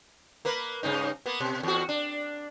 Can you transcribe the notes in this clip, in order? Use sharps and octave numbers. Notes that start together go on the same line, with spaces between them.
A#3 A#4 B4
G2 C#3 D#4
A#3 B3
B2
E2 F#4
D4